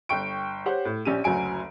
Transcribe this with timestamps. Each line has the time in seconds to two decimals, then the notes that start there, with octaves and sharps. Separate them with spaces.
0.09 G1 G5 C#6 D7
0.66 G4 C5 C#5 F#5
0.85 A2
1.05 A#1 C#4 G4 D#7
1.24 F#1 D2 F#3 G#5 D7